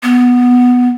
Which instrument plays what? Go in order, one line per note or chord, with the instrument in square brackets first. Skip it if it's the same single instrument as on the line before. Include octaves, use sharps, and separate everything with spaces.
[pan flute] B3